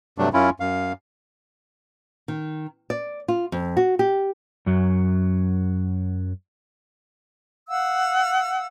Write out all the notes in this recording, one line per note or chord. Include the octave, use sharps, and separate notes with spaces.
G2 C3 F#3 A3 D4
F#2 C#4 E4 F4
F#2 F5
D#3
D5
F4
F2
F#4
G4
F#2 F#3
F5 F#5 E6